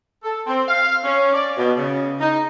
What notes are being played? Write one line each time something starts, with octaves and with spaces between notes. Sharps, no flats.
A4
C4
F5
C#4
D5
B2
C#3
D#4